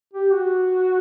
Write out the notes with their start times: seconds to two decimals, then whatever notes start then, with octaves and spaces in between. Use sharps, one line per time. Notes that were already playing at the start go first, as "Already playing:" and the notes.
0.13 G4
0.32 F#4